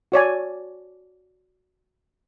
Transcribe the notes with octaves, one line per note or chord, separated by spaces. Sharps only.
F#4 C#5 D5 G#5